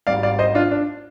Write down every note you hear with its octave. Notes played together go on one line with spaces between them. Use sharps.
G#1 G#2 G3 D5 F5
D5 F5
C5 D#5
D4 F4
D4